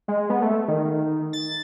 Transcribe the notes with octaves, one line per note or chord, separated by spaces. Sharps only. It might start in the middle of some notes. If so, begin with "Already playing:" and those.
G#3
B3
A3
D#3
A6